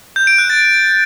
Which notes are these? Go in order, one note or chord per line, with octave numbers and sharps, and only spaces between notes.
G6
D7
F#6
A6